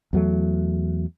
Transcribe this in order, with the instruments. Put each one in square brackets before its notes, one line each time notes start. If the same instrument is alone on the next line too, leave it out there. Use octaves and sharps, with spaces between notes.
[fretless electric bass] E2 F#3 A3